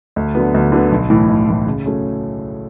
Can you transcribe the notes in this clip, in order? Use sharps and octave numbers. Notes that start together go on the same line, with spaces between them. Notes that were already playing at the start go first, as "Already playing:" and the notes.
D2
D3 F#3 B3
D2
D3 F#3 B3
B1
A2 E3
B1
A2 E3
C#3
F#3 A3 C#4 G#4